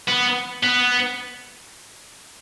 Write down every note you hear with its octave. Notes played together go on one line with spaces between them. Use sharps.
B3
B3